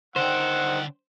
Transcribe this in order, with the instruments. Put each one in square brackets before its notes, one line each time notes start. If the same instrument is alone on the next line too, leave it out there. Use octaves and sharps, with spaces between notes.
[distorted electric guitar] D3 G5 [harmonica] D#3 F#5 E6 [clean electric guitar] C5